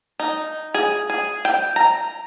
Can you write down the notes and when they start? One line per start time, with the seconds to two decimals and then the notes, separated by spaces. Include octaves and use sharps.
0.19 D#4
0.74 G#4
1.10 G#4
1.45 G5
1.76 A#5